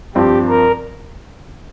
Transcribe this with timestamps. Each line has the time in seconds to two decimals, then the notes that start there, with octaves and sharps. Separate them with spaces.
0.15 G2 F3 C4 G4
0.49 A#4